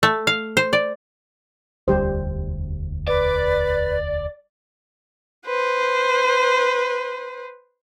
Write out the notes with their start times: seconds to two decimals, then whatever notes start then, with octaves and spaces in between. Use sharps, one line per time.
0.03 A3
0.27 F5
0.57 C5
0.73 D5
1.88 E1 D2 G3 G4 C5
3.08 B4 D5
5.46 B4 C5